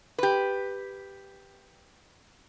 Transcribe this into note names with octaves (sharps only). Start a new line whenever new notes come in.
G4 B4